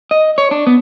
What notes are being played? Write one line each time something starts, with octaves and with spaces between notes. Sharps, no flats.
D#5
C#5
D4
B3